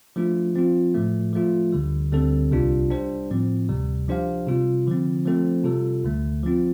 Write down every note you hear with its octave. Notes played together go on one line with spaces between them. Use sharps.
F3 A3 D4 F4
F3 C4 F4
A2 F3 A3
F3 A3 F4
D2 D3 G3
D2 D3 G3 C4 A4
C2 C3 G3 D4 F4
G3 D4 G4 C5
A2 F3 C4
D2 C3 G3
F3 D4 G4 C5 F5
C3 G3 F4
D3 F3 C4
F3 A3 C4 A4 C5
C3 G3 F4 A4
D2 D3 A3
F3 C4 F4